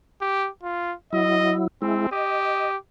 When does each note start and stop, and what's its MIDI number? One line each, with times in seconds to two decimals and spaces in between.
0.21 0.48 67
0.63 0.94 65
1.13 1.67 54
1.13 1.67 64
1.13 1.55 75
1.82 2.07 56
1.82 2.08 60
1.82 2.07 64
2.11 2.77 67
2.11 2.71 75